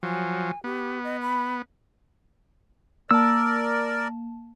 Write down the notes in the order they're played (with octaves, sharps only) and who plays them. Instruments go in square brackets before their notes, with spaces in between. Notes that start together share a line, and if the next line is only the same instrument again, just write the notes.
[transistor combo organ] F3 F#3 [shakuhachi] G#5
[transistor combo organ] B3 [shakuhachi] G4
[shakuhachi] D#5
B5
[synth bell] A#3 A5 [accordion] A#4 D5 [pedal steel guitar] E6